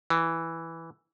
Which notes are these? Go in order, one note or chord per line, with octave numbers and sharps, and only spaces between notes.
E3